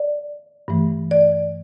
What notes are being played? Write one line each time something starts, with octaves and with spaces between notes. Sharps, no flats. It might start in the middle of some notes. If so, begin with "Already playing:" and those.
Already playing: D5
G2 E3 A3
D5